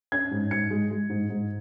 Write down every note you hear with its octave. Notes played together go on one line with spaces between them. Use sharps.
C#4 G#6
G#2
G#2 C#7
G#3
G#3
G#2
G#2